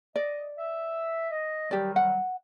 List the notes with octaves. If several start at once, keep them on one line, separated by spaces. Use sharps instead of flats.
D5 D#5
E5
D#5
D#3 F#3 G3 G4 D5
F#5